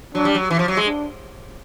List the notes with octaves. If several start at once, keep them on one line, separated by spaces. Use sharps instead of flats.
F#3 D4
G3
F#3
E3
F3
F#3
G#3
D4